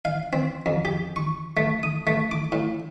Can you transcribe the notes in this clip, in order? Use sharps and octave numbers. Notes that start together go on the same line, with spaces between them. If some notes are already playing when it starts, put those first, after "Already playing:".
F5
C4
F2
G4
C#6
A3
D#6
A3
D6
A2